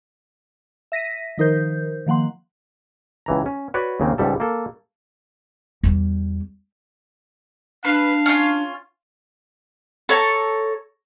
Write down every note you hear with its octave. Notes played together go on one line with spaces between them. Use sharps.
E5 A#6 B6 D#7
D#3 F3 D#4 A#4 C5 G6
D#3 F3 A#3 F#5 C6
C#2 E3 A#5
C#4
F#4 B4 C#5 D5 F#5
D#2 C#3 A#3 C4
C#2 G#2 G3 A4
A#3 A4
E2 G3
D4 B4 F5
C#4 F4
A4 C#5 A5 A#5